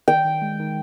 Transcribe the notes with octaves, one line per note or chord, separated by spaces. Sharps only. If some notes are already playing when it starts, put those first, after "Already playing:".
D#3 G5
D#3
G#3
D#3